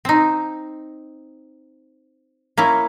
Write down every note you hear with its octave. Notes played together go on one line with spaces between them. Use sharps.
C4 D#4
A#3 C#4 E4